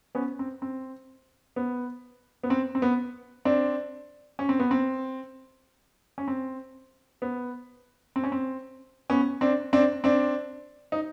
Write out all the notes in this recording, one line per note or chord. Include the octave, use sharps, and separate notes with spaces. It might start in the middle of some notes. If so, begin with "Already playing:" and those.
B3 C#4
C4
C4
B3
B3
C4
C4
B3
C4 D4
C#4
C4
B3
C4
C#4
C4
B3
C4
C#4
C4
B3 C#4
C4 D4
C4 D4
C4 D4
D#4